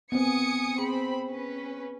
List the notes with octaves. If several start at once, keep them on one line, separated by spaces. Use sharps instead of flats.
B3 C4 G#5 D#6 C#7
C4 G#4 B5
C#4 B4